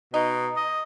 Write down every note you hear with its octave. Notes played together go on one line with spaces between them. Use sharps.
B2 D#4
D#5